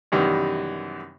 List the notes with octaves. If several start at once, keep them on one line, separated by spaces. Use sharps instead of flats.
F#2 C3 D#3 E3 G3 B3